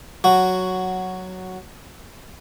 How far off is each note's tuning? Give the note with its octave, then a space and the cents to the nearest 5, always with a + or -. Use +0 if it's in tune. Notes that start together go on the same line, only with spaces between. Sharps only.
F#3 +0 F#4 +0